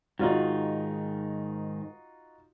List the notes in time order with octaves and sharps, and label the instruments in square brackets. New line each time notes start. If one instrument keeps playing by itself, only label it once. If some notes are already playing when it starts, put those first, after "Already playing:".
[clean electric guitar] G#2 D#3 [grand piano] D#4 F4 F#4